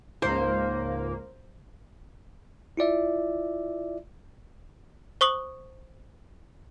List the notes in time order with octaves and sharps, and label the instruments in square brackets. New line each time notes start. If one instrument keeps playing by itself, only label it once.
[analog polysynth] C#2 G#2 A#3 [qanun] C5
[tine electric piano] E4 F4 D5 E5
[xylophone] C5 C#6 D#6 F#7